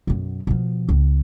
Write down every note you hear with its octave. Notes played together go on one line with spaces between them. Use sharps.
B1 F#2
B2 F3
C#2